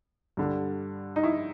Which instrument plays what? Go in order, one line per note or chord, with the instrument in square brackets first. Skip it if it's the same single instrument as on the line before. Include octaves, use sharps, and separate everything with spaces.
[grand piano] G2 D3 G3
[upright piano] D#4
E4